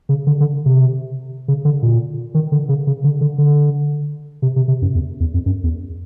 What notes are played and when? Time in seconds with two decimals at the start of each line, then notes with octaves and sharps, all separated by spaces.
0.09 C#3
0.27 D3
0.40 D3
0.66 C3
1.48 C#3
1.65 D3
1.83 A#2
2.34 D#3
2.52 D3
2.69 C#3
2.87 C#3
3.04 D3
3.21 D3
3.38 D3
4.42 C3
4.56 C3
4.68 C3
4.82 F#2
4.95 E2
5.20 E2
5.34 F2
5.46 F#2
5.64 E2